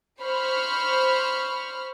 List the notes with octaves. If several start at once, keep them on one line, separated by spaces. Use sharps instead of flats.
C5 B5 C#6 F6